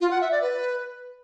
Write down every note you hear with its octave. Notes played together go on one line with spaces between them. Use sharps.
F4
F#5
E5
D5
B4